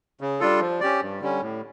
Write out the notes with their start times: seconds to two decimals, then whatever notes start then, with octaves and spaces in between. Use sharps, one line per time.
0.21 C#3
0.40 G3 D4 F4 A4
0.60 F3
0.80 C#4 G4 D5
1.01 G2
1.21 D3 G3 C#4
1.41 A2